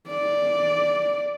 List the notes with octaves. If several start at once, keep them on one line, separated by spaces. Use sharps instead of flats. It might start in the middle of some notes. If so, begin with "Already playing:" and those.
D5